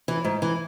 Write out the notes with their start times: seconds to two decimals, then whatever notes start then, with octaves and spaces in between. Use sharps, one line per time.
0.08 E3
0.24 G#2
0.42 E3